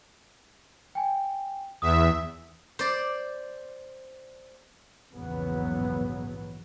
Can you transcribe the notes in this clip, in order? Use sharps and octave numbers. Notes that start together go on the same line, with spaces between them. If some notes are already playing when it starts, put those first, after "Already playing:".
G5 G#5
E2 E5 D#6
C5 D5
A#1 E2 G#2 C#3 F#3 B3